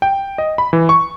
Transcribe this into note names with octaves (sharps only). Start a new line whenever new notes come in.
G5
D#5
B5
E3
C#6